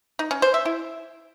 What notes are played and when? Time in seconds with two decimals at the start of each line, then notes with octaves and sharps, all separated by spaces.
0.19 D#4
0.31 C#4
0.42 C5
0.54 E5
0.65 E4